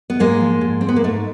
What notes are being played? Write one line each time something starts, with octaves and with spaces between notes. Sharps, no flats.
B3
G#2 G#3 A#3
F3
G#2
G#3 C4
B3
A#3
G#2 A3